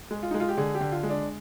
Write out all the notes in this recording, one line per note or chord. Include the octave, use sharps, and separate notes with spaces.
G#3
F4
G#3 D#4
F4
G4
D3 G#4
G4
D3
F4
G#3
D4